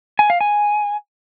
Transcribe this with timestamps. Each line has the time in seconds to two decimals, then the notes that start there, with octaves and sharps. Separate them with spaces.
0.19 G#5
0.30 F5
0.41 G#5